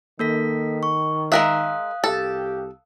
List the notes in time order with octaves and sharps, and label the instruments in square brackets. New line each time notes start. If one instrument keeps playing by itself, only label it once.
[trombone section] D#3 [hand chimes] A#3 A4 B6
[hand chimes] C#6
[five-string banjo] G#3 A#4 E5 [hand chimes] F5 D#6 F#6
[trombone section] C2 G4 [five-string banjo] A4